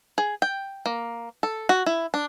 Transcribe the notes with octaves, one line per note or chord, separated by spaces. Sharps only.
G#4
G5
A#3
A4
F#4
E4
D4